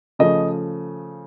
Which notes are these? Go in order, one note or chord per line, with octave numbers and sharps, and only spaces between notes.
C#3 F3 A3 D#5